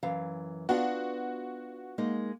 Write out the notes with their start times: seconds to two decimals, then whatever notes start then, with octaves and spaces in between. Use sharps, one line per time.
0.03 F#2 E3 F5
0.69 B3 D4 F4 F#4
1.98 G#3 A#3 D#4